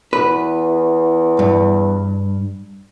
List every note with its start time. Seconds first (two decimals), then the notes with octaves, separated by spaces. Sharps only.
0.13 E2 B4
1.39 G2